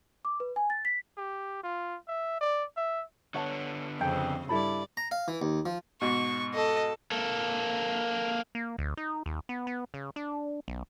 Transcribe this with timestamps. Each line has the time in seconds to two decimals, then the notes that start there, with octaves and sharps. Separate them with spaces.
0.25 D6
0.40 B4
0.56 G#5
0.70 A6
0.85 B6
1.17 G4
1.64 F4
2.08 E5
2.41 D5
2.77 E5
3.34 D3 B3 C#5 F#5 A5
4.01 F2 C#3 C4 G#4 A4 G5
4.49 G2 E4 A4 D5 B5
4.97 A#5
5.11 F5
5.28 E3
5.42 D#2
5.66 F3
6.01 G#2 B2 C#6
6.54 A4 D#5
7.12 A#3 A4
8.55 A#3
8.79 D2
8.97 D#4
9.26 D#2
9.49 B3
9.67 B3
9.94 C#3
10.16 D4
10.68 B1